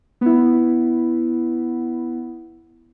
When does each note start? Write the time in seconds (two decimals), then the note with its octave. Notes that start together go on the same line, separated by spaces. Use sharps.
0.21 B3 E4